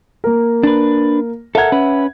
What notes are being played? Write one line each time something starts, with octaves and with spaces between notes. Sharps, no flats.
A#3 A#4
D4 B4
A4 A#4 E5 F#5 G#6
C#4 B4